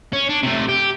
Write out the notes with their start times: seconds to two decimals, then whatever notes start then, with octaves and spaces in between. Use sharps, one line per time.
0.13 C#4
0.29 D4
0.43 C3 A3
0.69 G4